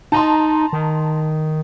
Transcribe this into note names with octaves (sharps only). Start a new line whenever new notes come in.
D#4 A5 A#5 C6
D#3